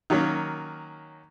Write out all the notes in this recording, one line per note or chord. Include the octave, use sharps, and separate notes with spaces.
D#3 F#3 A#3 C#4